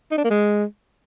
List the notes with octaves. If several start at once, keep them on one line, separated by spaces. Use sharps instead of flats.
D#4
D4
A#3
G#3